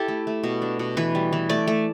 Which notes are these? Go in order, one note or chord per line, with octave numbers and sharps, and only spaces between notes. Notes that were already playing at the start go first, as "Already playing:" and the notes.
Already playing: E4 G4 A4
A3
A3
B2
D4
B2
E3 B4
G3
E3
A3 D5
A3